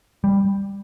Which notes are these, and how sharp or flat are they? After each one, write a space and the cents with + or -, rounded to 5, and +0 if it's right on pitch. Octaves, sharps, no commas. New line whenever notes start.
G3 +10